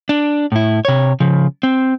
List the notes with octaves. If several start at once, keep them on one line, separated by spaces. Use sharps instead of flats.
D4
A2 E4
C3 C#5
C#3 F3
C4